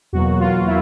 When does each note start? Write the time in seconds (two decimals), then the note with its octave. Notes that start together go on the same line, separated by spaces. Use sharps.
0.13 E2 B2 F#3 A#3 F#4
0.40 F4
0.67 E4